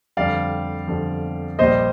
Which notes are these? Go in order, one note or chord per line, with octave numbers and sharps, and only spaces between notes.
F2 D3 G3 D5 F5
F2 D3 G3
A#1 A#2 G3 C5 D#5